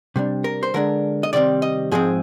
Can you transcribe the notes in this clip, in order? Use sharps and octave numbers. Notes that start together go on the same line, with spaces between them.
C3 G3 D4
A#4
C5
D3 G#3 D4 A#4
D#5
C3 D#3 G3 C4 D5
D#5
G#2 F3 G#3 C4 G#4